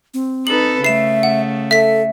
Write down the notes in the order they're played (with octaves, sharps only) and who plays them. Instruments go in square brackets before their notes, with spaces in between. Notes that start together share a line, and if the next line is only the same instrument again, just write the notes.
[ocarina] C4
[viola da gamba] D#4 A4 B4 [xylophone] F#7
[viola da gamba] C#3 A3 [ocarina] E5 [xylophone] C7 E7
[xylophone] F#5
[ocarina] A4 [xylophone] E5 B6